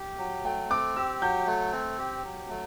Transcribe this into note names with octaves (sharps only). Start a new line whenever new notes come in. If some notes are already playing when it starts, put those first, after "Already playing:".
Already playing: G4
F#3
A3 G5
C4 D6
G4 E6
F#3 G6
A3
C4
G4
F#3
A3